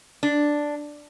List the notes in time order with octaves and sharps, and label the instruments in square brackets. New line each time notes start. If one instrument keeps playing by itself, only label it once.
[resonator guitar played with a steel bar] D4